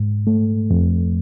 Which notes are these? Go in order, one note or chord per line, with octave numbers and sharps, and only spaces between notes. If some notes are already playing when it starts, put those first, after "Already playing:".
Already playing: G#2
A3
F2